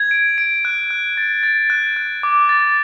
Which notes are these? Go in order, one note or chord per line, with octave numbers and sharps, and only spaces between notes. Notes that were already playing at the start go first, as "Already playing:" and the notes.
Already playing: G#6
D7
D7
F#6
F#6
A6
A6
F#6
F#6
D6
A6